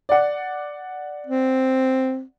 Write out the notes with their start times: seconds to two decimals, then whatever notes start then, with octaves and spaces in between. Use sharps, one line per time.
0.09 D5 F#5
1.27 C4